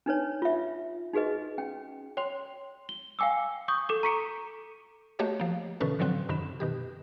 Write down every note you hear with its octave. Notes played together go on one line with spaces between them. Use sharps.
D4 D#4 B4 C#5
F4 E5
D#4 F#4 G#4 B4 D#5
C#4 G5
C#5 G5 C6 F7
G7
F5 G5 G#5 D6 E6
C#6 D#6 G6
A4 D6
A#5 C#6 B6 C#7 D7
A3 A#3 F#4 G4 C#5 D#5
F3 A#3
B2 D3 E3 C#4 A4 B4
A2 D3 F3 F#3 C4 F#6
F#2 C3 D#3 B5 E7
B2 D#3 G4